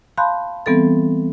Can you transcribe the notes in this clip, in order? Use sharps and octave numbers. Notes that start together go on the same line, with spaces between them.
F5 A5 B5 C6 F#6 G6
E3 G3 B3 C4 A4 A6